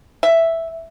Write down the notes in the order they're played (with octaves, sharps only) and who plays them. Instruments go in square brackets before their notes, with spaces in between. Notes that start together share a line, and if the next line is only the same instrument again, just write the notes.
[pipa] E5